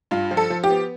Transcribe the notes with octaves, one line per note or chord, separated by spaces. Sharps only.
G2 F4
F3
A4
F3
G4
B3